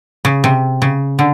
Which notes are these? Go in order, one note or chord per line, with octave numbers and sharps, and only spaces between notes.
C#3
C3
C#3
D3